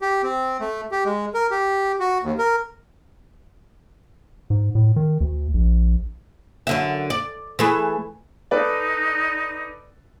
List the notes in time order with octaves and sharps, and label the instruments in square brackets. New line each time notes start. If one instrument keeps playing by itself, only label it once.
[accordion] G4
C4
A3
G4
G#3
A#4
G4
F#4
D#2
A#4
[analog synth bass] G#2
A2
D#3
D2
A#1
[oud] F#2 D3 E5
D5
E3 A3 G#4
[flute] D#4 [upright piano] A4 B4 D5